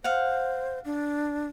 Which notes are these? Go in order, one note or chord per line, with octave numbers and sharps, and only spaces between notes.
C5 F5 F#5
D4